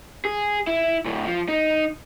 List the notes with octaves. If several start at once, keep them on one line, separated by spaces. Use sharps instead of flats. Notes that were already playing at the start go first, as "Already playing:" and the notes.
G#4
E4
D2 A2
F3
D#4